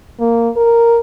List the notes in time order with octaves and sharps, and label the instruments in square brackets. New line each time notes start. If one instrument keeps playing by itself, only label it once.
[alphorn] A#3
A#4